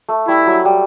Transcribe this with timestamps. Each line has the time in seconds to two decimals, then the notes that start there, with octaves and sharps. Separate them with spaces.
0.09 A3
0.27 G3 E4
0.46 F#3
0.65 G3